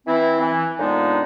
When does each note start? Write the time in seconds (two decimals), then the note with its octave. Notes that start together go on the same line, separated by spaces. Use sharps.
0.07 E3 C4 E4
0.40 E3
0.78 F2 A#2 G#3 B3 D4 D#4